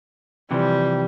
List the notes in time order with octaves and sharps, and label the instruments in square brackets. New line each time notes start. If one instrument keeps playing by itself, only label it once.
[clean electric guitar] C3 E3 F3 [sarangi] G3